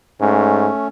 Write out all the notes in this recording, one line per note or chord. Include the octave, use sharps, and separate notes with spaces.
G#2 A3 C#4